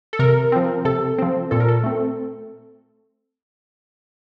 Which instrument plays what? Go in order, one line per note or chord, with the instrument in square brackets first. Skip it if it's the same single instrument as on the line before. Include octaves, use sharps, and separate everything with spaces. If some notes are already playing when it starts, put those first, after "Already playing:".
[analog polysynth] A4
C3 A#4
F3 C4
C3 A4
F3 C4
A#2 A4
A#4
A4
A3 C4